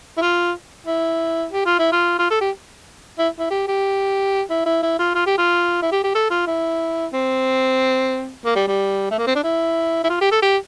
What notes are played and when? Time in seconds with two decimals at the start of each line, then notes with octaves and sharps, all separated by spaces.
0.17 E4
0.22 F4
0.87 E4
1.53 G4
1.66 F4
1.79 E4
1.92 F4
2.19 F4
2.30 A4
2.41 G4
3.19 E4
3.39 E4
3.50 G4
3.68 G4
4.50 E4
4.66 E4
4.83 E4
4.99 F4
5.15 F4
5.27 G4
5.38 F4
5.82 E4
5.92 G4
6.04 G4
6.15 A4
6.31 F4
6.47 E4
7.14 C4
8.45 A#3
8.56 G3
8.68 G3
9.11 A3
9.19 A#3
9.27 C4
9.36 D4
9.44 E4
10.04 E4
10.10 F4
10.21 G4
10.32 A4
10.42 G4